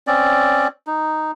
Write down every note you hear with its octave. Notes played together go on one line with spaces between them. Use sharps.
C4 C#4 D5
D#4